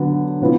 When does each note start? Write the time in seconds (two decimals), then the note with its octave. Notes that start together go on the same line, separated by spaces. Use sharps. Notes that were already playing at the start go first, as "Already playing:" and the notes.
Already playing: D3 F#3 B3
0.41 A2 F3 B3